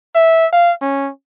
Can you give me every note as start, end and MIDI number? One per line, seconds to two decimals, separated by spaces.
0.15 0.46 76
0.53 0.72 77
0.82 1.10 61